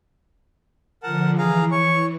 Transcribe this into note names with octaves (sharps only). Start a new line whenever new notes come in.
D3 F3 A#4 F#5 A5
E3 G#4 F5 A#5
C#5 C#6